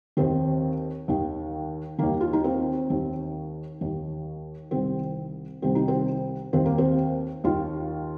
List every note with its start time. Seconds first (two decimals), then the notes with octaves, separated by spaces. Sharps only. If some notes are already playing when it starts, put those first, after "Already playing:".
0.17 D#2 D#3 C4
1.08 D#2 D#3
1.98 D#2 D#3 A#3
2.21 F4
2.33 D#4
2.44 C4
2.90 D#2 D#3
3.81 D#2 D#3
4.71 C2 C3 D#3 C4
5.62 C2 C3 D#3 C4
5.75 D#4
5.88 C4
6.53 D#2 D#3 C4
6.65 A#3
6.78 C4
7.44 D#2 D#3 F4